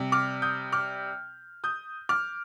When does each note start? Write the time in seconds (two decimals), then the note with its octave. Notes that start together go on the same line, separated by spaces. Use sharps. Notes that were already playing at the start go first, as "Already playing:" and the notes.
Already playing: C3 G3
0.12 D6 F6
0.42 D#6 G6
0.72 D6 F6
1.64 D#6 G6
2.09 D6 F6